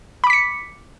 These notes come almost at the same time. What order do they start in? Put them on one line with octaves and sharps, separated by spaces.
B5 D6 B6 C#7